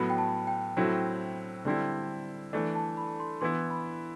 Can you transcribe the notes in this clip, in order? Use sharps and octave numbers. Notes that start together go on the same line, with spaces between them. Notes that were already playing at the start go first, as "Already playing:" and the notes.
Already playing: A2 F#3 B3 B5
G5
A5
G5
A2 F#3 C4 E4
D3 G3 C4 E4
E3 A3 D4
A5
B5
C6
E3 B3 E4 C6
B5